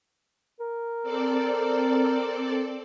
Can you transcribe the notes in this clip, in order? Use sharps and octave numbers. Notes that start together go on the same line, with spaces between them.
A#4
C4 A4 D5